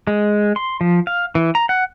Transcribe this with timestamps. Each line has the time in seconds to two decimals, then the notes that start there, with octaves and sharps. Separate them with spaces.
0.07 G#3
0.56 C6
0.81 F3
1.07 F5
1.35 E3
1.55 A#5
1.69 F#5